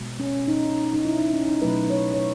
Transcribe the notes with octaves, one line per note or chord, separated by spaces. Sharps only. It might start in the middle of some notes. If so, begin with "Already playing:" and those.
Already playing: B2 G#3
C#4
D#4
D#4
E4
D#4
C#4
D#4
B2 F#3 A3 B4
C#5
C#5